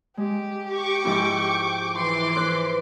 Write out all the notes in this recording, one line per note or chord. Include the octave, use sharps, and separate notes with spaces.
G#3 G4
G5 C#6 D6
G#2 F3 E4
E3 C6 D6
B4 C5